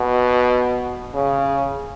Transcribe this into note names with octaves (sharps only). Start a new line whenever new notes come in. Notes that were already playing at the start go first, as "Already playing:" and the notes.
Already playing: B2
C#3